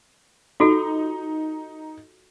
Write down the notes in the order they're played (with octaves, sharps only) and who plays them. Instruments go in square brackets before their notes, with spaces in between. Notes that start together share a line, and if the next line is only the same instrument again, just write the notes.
[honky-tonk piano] D#4 [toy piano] F4 F#4 A4